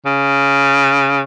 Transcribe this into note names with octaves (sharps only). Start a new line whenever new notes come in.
C#3